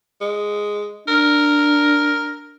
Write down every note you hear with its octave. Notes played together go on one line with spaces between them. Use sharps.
G#3
D4 A#4